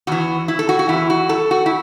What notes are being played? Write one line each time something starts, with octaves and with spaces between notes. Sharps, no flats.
E2 E3 F#4
E4
A4
F#4
F#4
E2 E3 E4
F#4
A4
F#4
E4